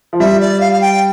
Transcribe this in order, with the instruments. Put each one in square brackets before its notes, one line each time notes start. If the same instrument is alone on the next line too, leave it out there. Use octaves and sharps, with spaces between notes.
[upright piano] F3
[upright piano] G3 [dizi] E5
[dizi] D5
F5
F5
G5